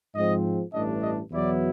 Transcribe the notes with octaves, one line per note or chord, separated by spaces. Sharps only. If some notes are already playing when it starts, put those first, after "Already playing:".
G#2 F3 G#3 C4 D#5
A1 G2 E3 A3 D4 D#5
D#5
E2 B2 F#3 B3 E4 D5